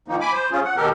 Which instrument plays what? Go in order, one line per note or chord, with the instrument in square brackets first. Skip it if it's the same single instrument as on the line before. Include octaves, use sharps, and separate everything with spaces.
[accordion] D#3 F3 A#3 D#4
G#5 B5 D6
C5
C#4 F4 G#4
F#5
D#2 B2 G4 A4 A#4